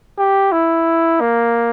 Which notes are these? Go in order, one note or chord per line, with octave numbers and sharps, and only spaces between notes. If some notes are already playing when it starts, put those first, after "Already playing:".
G4
E4
A#3